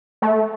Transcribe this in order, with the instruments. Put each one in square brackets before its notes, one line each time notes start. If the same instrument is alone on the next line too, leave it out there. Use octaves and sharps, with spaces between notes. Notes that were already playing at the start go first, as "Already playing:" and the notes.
[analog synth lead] A3